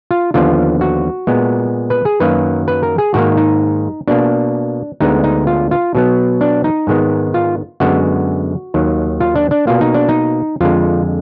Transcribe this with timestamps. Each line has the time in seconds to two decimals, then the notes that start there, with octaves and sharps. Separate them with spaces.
0.11 F4
0.34 D#2 D3 F3 B3 F4
0.81 F#4
1.27 A#2 G#3 B3
1.90 B4
2.05 G#4
2.20 F#2 D#3 F#3 A#3 B4
2.68 B4
2.83 A#4
2.98 G#4
3.14 G#2 D#3 A#3 F#4
3.37 D#4
4.07 B2 A#3 D4
5.00 D2 D3 G#3 B3 D#4
5.24 D#4
5.47 F4
5.71 F4
5.95 B2 F#3 B3
6.41 D4
6.64 D#4
6.87 G#2 D#3 G#3 B3
7.34 F4
7.80 F#2 D3 G#3 B3 F#4
8.74 D#2 D#3 F#3
9.20 F4
9.36 D4
9.51 D4
9.67 B2 A#3 F4
9.81 D#4
9.94 D4
10.09 D#4
10.60 F2 D3 G#3 F4